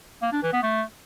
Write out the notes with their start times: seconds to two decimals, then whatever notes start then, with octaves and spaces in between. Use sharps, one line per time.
0.22 A#3
0.32 D4
0.43 E3
0.53 B3
0.63 A3